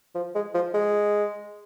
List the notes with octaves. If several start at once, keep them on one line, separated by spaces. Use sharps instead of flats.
F3
G#3
F3
G#3